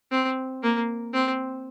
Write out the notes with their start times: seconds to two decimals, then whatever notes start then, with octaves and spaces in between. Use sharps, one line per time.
0.12 C4
0.63 A#3
1.14 C4